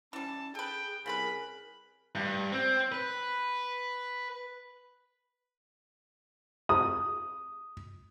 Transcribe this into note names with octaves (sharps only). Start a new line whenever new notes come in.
E3 G3 C#4 A5
G#4 A4 B4 G5
C2 C#3 F4 G#4 A#4 B4 B5
G2
C4
B4
D#6